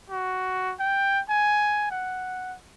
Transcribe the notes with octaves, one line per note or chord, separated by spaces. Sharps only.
F#4
G5
G#5
F#5